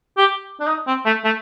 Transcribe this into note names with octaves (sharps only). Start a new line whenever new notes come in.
G4
D4
D#4
C4
A3
A3